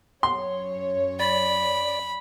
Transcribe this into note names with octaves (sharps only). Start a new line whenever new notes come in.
F#2 C#5 C6
D5 B5